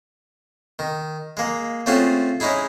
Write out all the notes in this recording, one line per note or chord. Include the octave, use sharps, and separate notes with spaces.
D#3
G#3 A#3
A3 C4 C#4 F4 F#4 G#4
G#3 C#4 D#4 E4 G#4